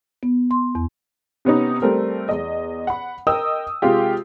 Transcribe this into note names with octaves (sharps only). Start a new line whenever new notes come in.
B3
C6
E2
C3 B3 C#4 D#4
G3 A3 C4 A#4
E2 D#5
F#5 B5
A#4 D#5 G5 D#6 E6
C3 G#3 F4 G4